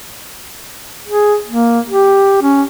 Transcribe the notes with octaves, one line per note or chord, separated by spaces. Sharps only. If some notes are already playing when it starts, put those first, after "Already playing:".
G#4
A#3
G4
C#4